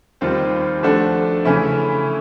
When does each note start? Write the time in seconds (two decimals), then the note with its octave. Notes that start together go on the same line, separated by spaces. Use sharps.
0.21 D#2 D#3 G3 C4 F4
0.83 F3 A3 D4 F#4 A4
1.44 C#3 E3 A3 C#4 E4